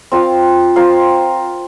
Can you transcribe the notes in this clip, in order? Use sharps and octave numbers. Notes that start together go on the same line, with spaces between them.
C4 F4 A#4 F5
C4 F4 A#4 F5